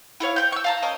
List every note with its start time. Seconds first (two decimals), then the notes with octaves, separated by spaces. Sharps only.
0.20 E4 A4 C#5 F5
0.36 G5 B5 G6
0.52 C#6 E6
0.64 F5 A5 A#5
0.82 C#4 A#4 D#5